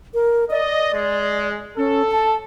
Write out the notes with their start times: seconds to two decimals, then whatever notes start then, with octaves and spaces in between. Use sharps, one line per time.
0.14 A#4
0.51 D5 D#5
0.94 G#3
1.77 C#4 A4
2.11 A5